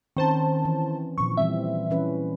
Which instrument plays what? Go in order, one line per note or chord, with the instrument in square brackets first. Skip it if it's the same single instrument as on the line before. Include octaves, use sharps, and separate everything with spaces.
[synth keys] D#3 C5 A5 [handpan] C4 C#4
[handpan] E3
[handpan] A#2 D#3 F3 [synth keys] C#6
[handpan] E3 G3 C4 [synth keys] E5
[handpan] E3 C#4 B4